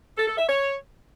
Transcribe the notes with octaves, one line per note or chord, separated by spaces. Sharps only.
A4
A4
E5
C#5